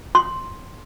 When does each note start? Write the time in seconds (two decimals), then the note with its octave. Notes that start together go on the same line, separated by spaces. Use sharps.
0.15 C6